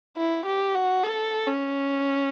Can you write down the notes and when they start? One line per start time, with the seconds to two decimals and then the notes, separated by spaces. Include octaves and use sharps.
0.18 E4
0.46 G4
0.75 F#4
1.04 A4
1.47 C#4